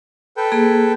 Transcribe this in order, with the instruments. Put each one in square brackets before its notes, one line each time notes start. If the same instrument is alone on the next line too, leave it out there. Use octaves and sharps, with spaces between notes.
[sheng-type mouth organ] A4 B4 G5
[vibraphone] A#3 G#4